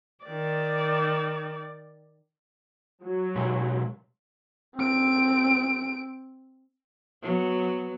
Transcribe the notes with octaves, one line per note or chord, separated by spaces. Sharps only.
D#3 D5
F#3
B2 G#3 G4
C4 D7
F#3 B3